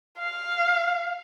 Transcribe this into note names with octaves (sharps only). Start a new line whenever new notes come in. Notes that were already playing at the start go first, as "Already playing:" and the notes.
F5